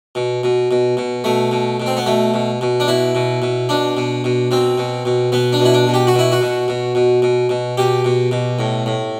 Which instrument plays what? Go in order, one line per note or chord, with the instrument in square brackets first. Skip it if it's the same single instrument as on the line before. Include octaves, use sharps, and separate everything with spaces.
[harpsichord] B2
B2
B2
B2
B2 A3
B2
B2
C4
B3
B2 A3
B2
B2
D4
B2 E4
B2
B2
B2 D4
B2
B2
B2 C4
B2
B2
B2 B3
D4
B2
E4
D4
B2
G4
F#4
B2 E4
F#4
B2
B2
B2
B2
B2
B2 G4
B2
B2
A2
A2